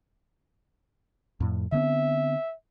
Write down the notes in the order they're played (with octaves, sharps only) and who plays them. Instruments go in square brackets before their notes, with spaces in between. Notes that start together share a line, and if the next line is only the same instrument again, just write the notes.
[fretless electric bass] F2 A2
[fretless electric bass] D3 B3 C4 [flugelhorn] E5